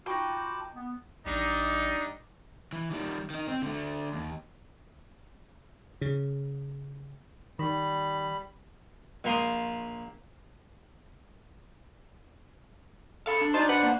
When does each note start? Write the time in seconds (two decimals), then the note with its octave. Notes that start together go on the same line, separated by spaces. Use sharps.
0.06 D#4 F4 F#4 G5 A5 B5 D6
0.75 B3
1.26 A1 G3 D4 D#4
2.73 E3
2.91 D#3 G3
3.30 D#3 D#4
3.48 C4
3.62 D3 A3
4.13 D#2
6.01 C#3
7.59 D#3 G3 B5
9.24 A#1 A#3 C6 D#6
13.27 A4 F5 B5 C#7
13.41 D4
13.54 D4 D#4 F#4 C5 A5 C6 C7
13.69 B4 C5 D5 F#5
13.83 A#3